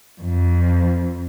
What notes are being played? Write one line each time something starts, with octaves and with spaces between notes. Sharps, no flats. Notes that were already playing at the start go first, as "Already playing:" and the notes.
F2